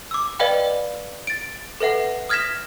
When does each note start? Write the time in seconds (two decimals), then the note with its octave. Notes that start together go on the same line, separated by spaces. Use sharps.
0.11 D6 E6
0.39 B4 D5 D#5 F5 G5 B5
1.27 A6 D7
1.80 A4 B4 E5 F#5
2.29 D#6 F6 G#6 A#6 B6 E7